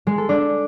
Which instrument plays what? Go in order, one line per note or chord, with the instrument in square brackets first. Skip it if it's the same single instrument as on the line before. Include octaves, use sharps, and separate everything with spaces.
[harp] G#3
A4
D4